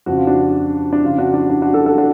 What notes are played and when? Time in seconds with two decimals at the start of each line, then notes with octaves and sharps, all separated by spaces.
0.06 F2 C#3 F#4
0.17 F4
0.27 D4 F#4
0.93 D4
1.02 F2 C#3 F4
1.18 D4 F#4
1.34 D4 F#4
1.50 D4 F#4
1.62 D4 F#4
1.74 F#4 A4
1.86 F#4 A4
1.98 D4 F#4